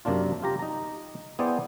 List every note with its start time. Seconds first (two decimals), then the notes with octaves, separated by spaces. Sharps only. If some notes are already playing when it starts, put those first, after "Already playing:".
0.05 F#2 C3 A#3 D4 F4
0.42 F4 G4 A#5
0.59 D#4 A#5
1.39 B3 E4 G#4 C5 D5 G5